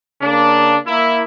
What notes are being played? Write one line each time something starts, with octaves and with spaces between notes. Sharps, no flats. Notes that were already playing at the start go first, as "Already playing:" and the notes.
C#3 A#3 D4
A#3 E4